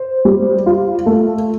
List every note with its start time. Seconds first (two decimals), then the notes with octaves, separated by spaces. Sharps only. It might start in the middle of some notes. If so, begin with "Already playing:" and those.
Already playing: C5
0.25 G3
0.66 F4
1.06 A3